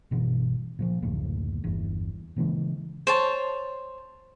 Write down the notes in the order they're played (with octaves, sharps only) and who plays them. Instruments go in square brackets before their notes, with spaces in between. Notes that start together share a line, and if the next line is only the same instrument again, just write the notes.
[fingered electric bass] G1 B2 E3
A#2 E3 F3
F#1 D2 A2
G1 E2
A#2 C#3 E3 G#3
[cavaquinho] C5 C#5 A5